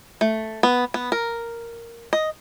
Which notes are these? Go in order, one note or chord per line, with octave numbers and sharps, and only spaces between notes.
A3
B3
B3
A#4
D#5